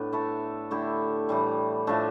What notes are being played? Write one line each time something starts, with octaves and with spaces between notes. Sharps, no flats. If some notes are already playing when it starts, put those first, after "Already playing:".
Already playing: A2 B3 D4
A3 E4 A4
D3 A3 E4 G4
A2 E3 G3
A2 F3 A3 D4